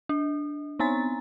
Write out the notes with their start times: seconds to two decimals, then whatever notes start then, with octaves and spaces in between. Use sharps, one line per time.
0.09 D4
0.79 B3 C4 D#4 G#5 A#5 A6